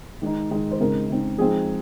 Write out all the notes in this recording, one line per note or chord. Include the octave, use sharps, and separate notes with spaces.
D#3 G#3 D#4
D#3 G#3 D#4
C5
C#3 G#3 C4 D#4 A#4
C#3 G#3 C4 D#4
F3 G#3 C4 D#4 G#4